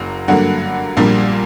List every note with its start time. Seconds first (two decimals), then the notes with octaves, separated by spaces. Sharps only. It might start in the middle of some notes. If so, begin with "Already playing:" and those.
Already playing: F#1 F#3 A#3
0.28 G2 D3 F#3 A#3 F#5
0.97 A#1 A#2 G3 A#3 D4